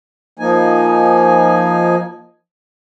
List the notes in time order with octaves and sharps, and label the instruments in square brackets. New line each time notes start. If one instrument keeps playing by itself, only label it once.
[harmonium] F3 A#3 D#4 G#5